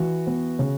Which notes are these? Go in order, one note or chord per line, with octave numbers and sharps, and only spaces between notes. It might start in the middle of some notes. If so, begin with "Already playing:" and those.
Already playing: E3 F#4
B3
C#3